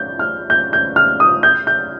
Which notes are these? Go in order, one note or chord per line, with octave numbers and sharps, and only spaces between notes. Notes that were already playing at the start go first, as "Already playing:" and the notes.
Already playing: G6
F6
G6
G6
F6
D#6
G6
G6